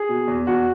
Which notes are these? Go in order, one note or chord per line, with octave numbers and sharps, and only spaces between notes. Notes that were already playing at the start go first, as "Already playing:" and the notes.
Already playing: G#4
B2
E2
E2 F#4